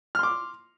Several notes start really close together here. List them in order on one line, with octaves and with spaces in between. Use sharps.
F6 C6 D6